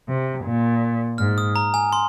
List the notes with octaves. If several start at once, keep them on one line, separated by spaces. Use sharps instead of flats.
C3
A#2
G#2 F6
D#6
A#5
G#5
C6